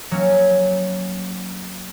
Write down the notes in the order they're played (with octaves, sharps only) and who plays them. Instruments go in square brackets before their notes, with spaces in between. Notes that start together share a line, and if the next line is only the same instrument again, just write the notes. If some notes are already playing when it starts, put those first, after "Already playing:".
[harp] F#3 A#3 C#4